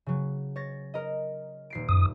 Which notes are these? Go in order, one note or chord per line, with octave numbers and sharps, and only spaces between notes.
C#3 F#3
C#5 A6 A#6
A#4 D#5
D#1 C7 D7
F#2 D#6